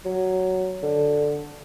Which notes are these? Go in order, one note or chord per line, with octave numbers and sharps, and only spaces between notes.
F#3
D3